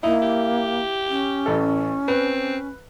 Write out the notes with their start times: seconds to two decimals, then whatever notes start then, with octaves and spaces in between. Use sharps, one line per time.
0.03 A#3 D#4 E4
0.22 G4
1.09 C#4
1.46 A1 A4
2.08 C4 B4